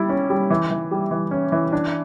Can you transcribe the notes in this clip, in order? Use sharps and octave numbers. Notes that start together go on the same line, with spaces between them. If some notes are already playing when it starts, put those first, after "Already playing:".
Already playing: G3 E4
C#4
G3
E3
E3
G3
E3
C#4
E3
D4